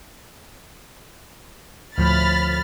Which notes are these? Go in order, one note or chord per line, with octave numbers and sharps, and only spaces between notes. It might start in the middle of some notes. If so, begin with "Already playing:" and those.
D2 A2 F3 B5 F6 A6